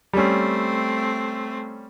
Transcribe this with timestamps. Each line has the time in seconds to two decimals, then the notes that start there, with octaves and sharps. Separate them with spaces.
0.13 G3 A3 C4 C#4